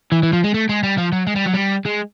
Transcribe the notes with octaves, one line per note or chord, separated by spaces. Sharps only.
E3
E3
F3
G#3
A3
G#3
G3
F3
F#3
G#3
G3
F#3
G3
G#3